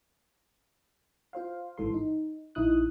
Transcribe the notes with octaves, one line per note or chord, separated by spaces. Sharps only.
F4 C5 F5
G1 G#2 E3 A4 C6
D#4
A#1 D#4 E4 D#6 F#6